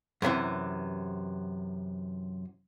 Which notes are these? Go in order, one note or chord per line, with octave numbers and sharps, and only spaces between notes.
F#2 C3 D#3 E3